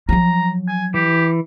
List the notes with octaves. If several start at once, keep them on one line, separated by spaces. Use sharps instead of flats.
F3 F#3 A#5
G#5
E3 G4